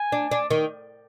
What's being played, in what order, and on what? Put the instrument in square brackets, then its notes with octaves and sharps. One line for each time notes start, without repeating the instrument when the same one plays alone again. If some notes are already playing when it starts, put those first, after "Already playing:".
Already playing: [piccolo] G#5
[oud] D4
D4
D#3